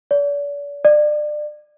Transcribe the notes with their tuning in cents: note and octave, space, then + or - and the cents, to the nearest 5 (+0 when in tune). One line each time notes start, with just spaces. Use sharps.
D5 -40
D5 +30